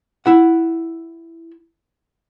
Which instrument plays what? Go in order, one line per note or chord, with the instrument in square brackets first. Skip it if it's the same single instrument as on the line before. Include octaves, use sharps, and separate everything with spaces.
[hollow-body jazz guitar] E4 F#5